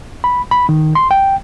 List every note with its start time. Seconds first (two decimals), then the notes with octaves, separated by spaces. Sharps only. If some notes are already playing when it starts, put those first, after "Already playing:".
0.24 B5
0.51 B5
0.69 D#3
0.95 C6
1.11 G5